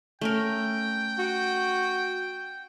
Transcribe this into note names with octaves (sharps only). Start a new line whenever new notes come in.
A3 C#4 A#4 G5
F#4